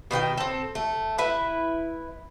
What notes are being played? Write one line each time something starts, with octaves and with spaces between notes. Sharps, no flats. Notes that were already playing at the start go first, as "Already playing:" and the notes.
B2 D#3 F4 G5
C4 A4
A3
E4 B4 E5